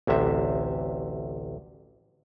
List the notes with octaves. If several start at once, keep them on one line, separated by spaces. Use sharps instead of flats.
A1 D2 C3 E5